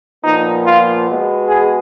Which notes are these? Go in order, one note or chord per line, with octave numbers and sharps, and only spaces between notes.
A#2 F3 B3 D#4
F4
B2 G#3 B3
G#4